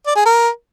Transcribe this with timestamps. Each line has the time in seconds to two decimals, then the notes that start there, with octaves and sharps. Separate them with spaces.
0.06 D5
0.16 G#4
0.25 A#4